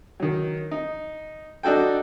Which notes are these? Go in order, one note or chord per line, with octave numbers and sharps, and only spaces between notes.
D#3 F#3
D#4
D4 D#4 F#4 A4 G5